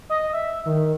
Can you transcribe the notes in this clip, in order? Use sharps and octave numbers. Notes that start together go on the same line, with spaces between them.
D#5
E5
D#3